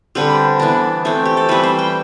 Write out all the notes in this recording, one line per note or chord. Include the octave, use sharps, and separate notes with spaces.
D3 G3 C4 B4
E3 B3 D4
E3 A3 C4
G4
A4
E3 G3 C4 B4
C5
G5